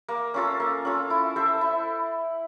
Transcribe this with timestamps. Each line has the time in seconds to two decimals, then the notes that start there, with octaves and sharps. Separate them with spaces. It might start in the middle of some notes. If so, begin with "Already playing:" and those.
0.08 A#3
0.34 C#4 F4 A4
0.60 A#3
0.85 C#4 F4 A4
1.10 E4
1.36 A4 C5 E5
1.61 E4